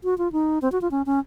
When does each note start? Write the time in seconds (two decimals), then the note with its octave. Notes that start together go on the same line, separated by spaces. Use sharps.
0.04 F#4
0.18 F4
0.32 D#4
0.62 C4
0.72 F#4
0.82 F4
0.91 C#4
1.06 C#4